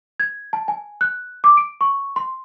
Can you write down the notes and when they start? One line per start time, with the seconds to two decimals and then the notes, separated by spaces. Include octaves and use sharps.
0.20 G#6
0.53 A5
0.68 G#5
1.01 F#6
1.44 D6
1.57 D7
1.81 C#6
2.16 C6